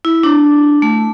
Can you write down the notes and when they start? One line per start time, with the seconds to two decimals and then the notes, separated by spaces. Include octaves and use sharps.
0.05 E4
0.23 D4
0.82 A3